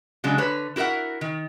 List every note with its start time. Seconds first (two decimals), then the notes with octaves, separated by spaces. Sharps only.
0.24 C#3 F#3 G#3 D4
0.38 D3 B4 C#5
0.76 E4 F#4 A#4 E5 F#5
1.21 D#3